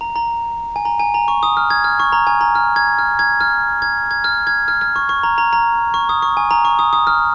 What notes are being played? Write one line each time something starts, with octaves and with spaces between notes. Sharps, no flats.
A#5
A#5
G#5
A#5
G#5
A#5
C#6
D#6
F6
G#6
F6
C#6
A#5
G#5
A#5
F6
G#6
F6
G#6
F6
G#6
G#6
F6
G#6
F6
F6
C#6
C#6
A#5
A#5
A#5
C#6
D#6
C#6
G#5
A#5
C#6
D#6
D#6
F6